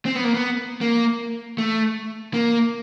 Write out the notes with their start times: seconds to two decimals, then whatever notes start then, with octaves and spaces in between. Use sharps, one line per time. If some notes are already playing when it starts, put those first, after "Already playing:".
0.05 C4
0.15 B3
0.24 A#3
0.35 B3
0.81 A#3
1.58 A3
2.34 A#3